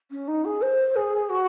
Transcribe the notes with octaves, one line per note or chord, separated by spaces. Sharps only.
C#4
D#4
G#4
C5
G#4
F#4